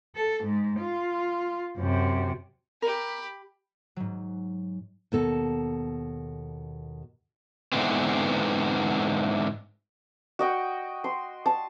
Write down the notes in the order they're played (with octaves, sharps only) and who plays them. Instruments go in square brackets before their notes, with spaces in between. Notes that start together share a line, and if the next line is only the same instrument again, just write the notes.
[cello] A4
G#2
F4
F#2 C3
[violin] G4 B5 [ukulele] A#4
[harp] G#2 F#3
[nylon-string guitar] D#2 B2 A4 A5
[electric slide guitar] G#2 B2 D3 E3 B3 C4
[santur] F#4 D#5 G5
C6
A5